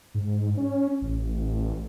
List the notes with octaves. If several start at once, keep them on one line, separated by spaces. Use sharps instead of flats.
G#2
C#4
A1